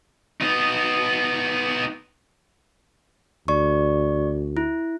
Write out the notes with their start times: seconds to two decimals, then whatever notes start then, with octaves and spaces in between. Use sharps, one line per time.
0.41 B3 D#4
3.48 D2 D5 C#6
4.57 E4